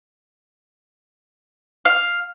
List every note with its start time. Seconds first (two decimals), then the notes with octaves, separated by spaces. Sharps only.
1.85 F5